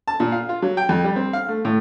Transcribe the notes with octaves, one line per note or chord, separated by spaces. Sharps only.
A5
A#2
F5
F4
F#3
G5
F2
G3
C4
F5
A3
A2